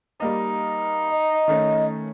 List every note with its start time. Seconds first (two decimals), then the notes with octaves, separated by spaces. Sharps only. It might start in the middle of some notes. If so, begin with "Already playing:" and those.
0.20 G3 A#3 D#4 D#5
1.10 D#5
1.48 D#3 A3 C#4